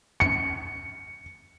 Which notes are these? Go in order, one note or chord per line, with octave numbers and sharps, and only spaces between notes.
C#7